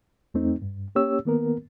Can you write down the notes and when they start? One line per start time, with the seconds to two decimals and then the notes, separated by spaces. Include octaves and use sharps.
0.34 E2 A3 C4 D#4
0.62 G2
0.95 A#3 C#4 G4 C#5 E6
1.25 D#3 A#3 B3 A#4